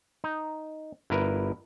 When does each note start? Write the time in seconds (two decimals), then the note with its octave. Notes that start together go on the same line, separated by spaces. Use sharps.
0.24 D#4
1.10 G1 E4 A#4 B4